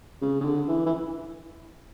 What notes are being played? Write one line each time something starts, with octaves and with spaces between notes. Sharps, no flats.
C#3
C#3
D3
E3
E3